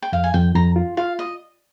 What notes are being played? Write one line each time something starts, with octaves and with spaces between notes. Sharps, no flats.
G5
F2 F5
G#5
F2 G5
F2 A#5
F4
F4 F5
D#5